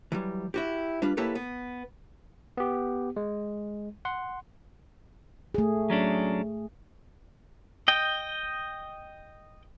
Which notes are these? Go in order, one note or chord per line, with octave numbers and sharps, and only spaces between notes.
E3 F#3 G3
E4 F#4 G4
G3 D4 F4 B4
A#3 E4 G4 A4 B4 C#5
B3
B3 G4
G#3
F#5 C6
A3 G#4
F#3 C#4 D4
D#5 G5